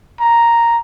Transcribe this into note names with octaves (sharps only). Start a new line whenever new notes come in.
A#5